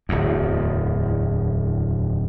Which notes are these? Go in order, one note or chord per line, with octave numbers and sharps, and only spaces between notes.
D1 E2